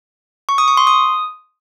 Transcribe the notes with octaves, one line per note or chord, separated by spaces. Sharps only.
C#6
D#6
C#6
C6
D#6